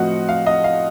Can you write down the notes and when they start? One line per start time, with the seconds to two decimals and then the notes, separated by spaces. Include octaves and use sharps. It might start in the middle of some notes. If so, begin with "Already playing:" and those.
Already playing: A2 F3 A3 C4 F#4 D#5 F#5
0.29 F5
0.46 D#5
0.64 F5